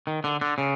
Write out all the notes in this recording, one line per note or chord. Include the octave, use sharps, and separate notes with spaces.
D#3
D3
D3
C#3